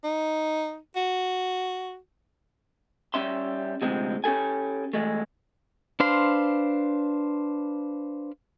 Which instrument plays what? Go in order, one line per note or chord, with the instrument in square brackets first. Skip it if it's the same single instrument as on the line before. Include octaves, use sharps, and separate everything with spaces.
[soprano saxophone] D#4
F#4
[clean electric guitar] G3 C#4 E5 C6
D2 A2 C3 F3 G#3 C4
C#4 G4 A4 G#5
E3 G#3 A3
[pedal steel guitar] D4 B4 C5 F5 C6